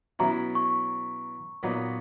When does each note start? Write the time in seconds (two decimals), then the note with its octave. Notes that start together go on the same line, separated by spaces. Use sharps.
0.19 B2 F#3 C#4 E4 A#5
0.55 C#6
1.63 A#2 F#3 B3 D#4